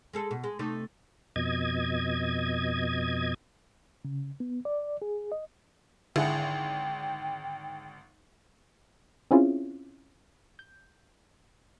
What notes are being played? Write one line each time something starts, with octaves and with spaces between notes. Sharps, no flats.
G#3 G#4 A4
B2
G#3
C3 A3 D#4
F2 B2 D#5 G#6
C#3
B3
D5
G#4
D#5
G#1 D3 E4 G#4 F#5 G5
C4 C#4 E4 F4 G#4
G6